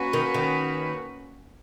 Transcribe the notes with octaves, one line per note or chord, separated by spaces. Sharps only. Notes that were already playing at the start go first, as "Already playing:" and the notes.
Already playing: A#3 C#4 F#4 B4
D#3
D#3